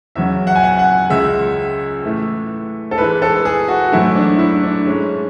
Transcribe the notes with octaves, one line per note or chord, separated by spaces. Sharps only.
E2 C#3 F#3 E5
F#5
G#5
F#5
F#5
C#2 C#3 G#3 E5
A2 E3 A3
A4
G#2 E3 G#3 B4
A4
G#4
F#4
G#2 F#3 A3 E4
D4
E4
D4
G#2 G#3 C#4